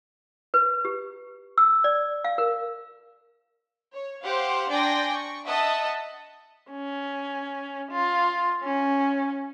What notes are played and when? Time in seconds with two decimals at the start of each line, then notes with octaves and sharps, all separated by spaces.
0.54 B4
0.85 G4
1.58 E6
1.84 D5
2.25 F5
2.38 A#4
3.93 C#5
4.23 G4 C5 F5 F#5
4.69 D4 D5 G5 G#5 C6 A#6
5.13 C#6
5.47 D#5 E5 F#5 A5
6.71 C#4
7.92 F4
8.63 C#4